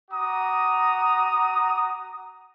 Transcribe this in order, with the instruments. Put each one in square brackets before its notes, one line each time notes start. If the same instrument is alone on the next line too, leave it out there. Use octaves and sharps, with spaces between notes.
[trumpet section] F#4 A#5 D6 D#6